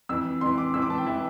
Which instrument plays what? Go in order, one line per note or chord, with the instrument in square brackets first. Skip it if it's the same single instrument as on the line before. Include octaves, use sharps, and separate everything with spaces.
[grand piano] F2 E3 E6
F2 E3 C6
D6
F2 E3 E6
D6
A5
G5
E3 E5